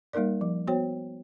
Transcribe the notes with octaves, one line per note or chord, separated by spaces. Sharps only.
G3 A#3 D#4 A#4 D5
F3
B3 F#4 C5 C#5 G5